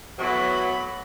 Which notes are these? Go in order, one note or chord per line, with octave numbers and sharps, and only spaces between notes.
A2 E3 F#3 B3 F#4 B5